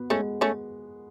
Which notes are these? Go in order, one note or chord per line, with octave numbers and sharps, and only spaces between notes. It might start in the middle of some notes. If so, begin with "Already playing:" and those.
Already playing: B3 F#4
G#3 A3 C#4
A3 C#4